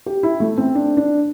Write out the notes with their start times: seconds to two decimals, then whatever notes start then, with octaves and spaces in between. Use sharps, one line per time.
0.06 G4
0.23 E4
0.40 A3
0.58 C4
0.75 D4
0.97 D4